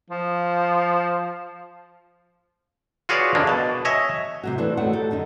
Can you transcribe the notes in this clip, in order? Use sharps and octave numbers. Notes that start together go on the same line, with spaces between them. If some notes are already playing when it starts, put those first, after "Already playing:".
F3
F4 F#4 G#4 B4 C#5 D5
D3 G#3 A#3 D4
B2 A5
C#5 D#5 E5 G#5
C3 F#3 F#4
E3 A3 D4 A4 B4 C5
D#3 A3 F#4 A4 C#5 F#5
G4 A4
F#2 D3 D#4